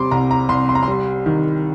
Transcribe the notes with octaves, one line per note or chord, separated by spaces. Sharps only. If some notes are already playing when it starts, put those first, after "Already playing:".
Already playing: C3 G3 C6 D6
C2 A#5
A#5
C2 C6
C6
A#5
C6
G3
D#3